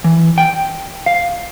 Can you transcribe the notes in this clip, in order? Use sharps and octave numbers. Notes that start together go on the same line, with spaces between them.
E3
G5
F5